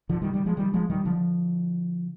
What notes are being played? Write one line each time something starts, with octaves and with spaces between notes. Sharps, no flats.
D3 F3
D#3 G3
D#3 G3
F3 G#3
D#3 G3
F3 G#3
D#3 G3
D3 F3